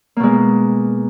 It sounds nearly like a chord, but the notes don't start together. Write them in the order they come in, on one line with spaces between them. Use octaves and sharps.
A#3 B2 G#3